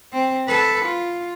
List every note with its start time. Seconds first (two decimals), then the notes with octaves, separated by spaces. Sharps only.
0.13 C4
0.48 A4 B4
0.86 F4